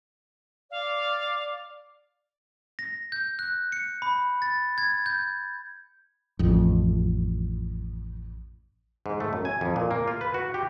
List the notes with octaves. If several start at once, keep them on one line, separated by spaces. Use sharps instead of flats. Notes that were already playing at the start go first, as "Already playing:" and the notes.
D5 F5
A#6
G6
F#6
C#7
B5
A6
G#6
G6
A1 F2
G#2
A3
F#2
G#5
F2
A#2
A#3
F4
B4
F#4
G4